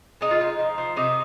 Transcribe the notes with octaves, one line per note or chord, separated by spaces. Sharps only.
G#3 D#4
F4
G#3 D#4
F3
F3
C3 D#4